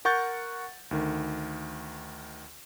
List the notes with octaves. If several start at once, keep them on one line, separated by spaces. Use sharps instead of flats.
A#4 F#5 C#6 G6 A6
D2 D#3